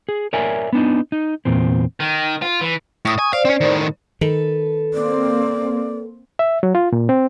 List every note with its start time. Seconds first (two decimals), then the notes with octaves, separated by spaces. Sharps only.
0.09 G#4
0.33 A#4 C#5 D5 E5 G#5
0.73 B3 D4 D#4
1.12 D#4
1.45 E2 A#2 C4
2.00 D#3
2.42 F4
2.61 E3
3.05 A2 C#6 D#6
3.19 G#5
3.33 C5 D5 F5
3.45 C4 C#4
3.61 A2 D#3
4.21 D#3 A4 B4
4.94 A#3 C4 D5
6.39 E5
6.63 F#3
6.75 F4
6.93 A#2
7.09 C4